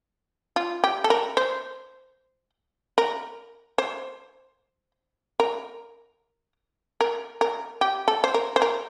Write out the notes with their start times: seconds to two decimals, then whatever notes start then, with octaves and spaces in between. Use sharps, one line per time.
0.56 F4
0.84 G4
1.04 A4
1.10 A#4
1.37 C5
2.98 A#4
3.78 C5
5.40 A#4
7.01 A#4
7.41 A#4
7.81 G4
8.08 A4
8.24 C5
8.34 A#4
8.56 C5
8.62 A#4